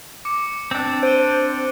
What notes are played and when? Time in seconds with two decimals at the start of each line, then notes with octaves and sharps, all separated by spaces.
0.25 D6 C#7
0.71 C4 D4
1.03 C5 D7 D#7 G7